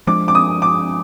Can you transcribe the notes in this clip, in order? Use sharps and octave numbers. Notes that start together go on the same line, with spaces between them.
F3 G#3 D4 D6
D6
D#6
D6